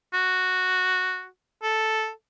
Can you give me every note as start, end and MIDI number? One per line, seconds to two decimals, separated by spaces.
0.13 1.27 66
1.63 2.10 69